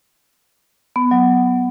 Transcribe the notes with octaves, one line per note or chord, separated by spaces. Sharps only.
B3
F#3